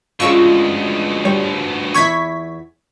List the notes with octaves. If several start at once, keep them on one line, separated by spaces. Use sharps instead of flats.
D2 B2 G#3 C#4 F4 C#6 E6
G3 C#5
E2 E4 C#6 G#6 B6